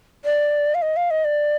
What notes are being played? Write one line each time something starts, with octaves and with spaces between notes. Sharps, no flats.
D5
F5
D#5
F5
D#5
D5